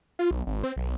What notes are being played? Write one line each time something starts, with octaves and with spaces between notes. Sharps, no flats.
F4
B1
G#1
C4
B1